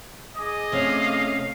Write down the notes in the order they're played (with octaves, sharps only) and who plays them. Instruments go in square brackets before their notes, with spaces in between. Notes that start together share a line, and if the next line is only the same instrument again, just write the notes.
[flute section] G#4 D6 D#6 [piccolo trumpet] D#5
[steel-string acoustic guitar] C3 C#4 [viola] A3 F5